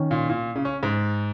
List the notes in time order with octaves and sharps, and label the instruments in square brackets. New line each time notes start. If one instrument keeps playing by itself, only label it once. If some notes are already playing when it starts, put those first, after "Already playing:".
Already playing: [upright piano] D#3 C#4
[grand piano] A#2
A#2
C#3
C#4
G#2